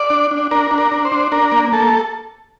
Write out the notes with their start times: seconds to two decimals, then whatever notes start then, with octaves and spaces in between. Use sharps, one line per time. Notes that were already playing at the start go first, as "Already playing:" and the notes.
Already playing: D5
0.10 D4
0.31 D4
0.51 D4 A#4
0.71 D4
0.78 A#4
0.91 D4
1.05 C5
1.12 D4
1.32 D4 A#4
1.52 A#3
1.72 A#3 A4